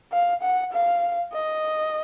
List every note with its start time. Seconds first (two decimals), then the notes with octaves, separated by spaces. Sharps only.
0.12 F5
0.43 F#5
0.73 F5
1.33 D#5